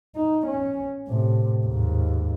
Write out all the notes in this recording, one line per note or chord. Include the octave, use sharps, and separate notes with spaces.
D#4
C#4
A2 C3
D#2 G#2